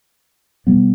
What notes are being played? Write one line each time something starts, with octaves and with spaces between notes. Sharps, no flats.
B2 G3 B3